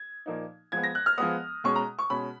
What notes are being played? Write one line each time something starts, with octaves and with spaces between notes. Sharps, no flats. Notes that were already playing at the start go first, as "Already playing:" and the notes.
Already playing: G#6
A#2 F3 A#3 D#4
F3 G#3 B3 G#6
A#6
F#6
F6
F3 G#3 B3 D#6
B2 G#3 C#4 C#6
A#5
C#6
B2 G#3 C#4 B5